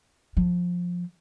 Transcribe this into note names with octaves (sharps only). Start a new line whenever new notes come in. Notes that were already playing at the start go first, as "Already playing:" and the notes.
F3